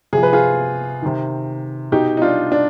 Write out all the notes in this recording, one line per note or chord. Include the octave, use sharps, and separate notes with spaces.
C3 F3 G#4
B4
F4 G#4
C3 D#3
B2 D#4 G4
D#4
D4 F4
D4